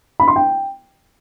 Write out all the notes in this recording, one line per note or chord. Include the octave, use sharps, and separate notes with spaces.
B5
C6
G5